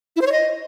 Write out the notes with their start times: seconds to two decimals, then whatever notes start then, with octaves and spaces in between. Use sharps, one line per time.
0.16 E4
0.21 C5
0.27 C#5
0.32 D#5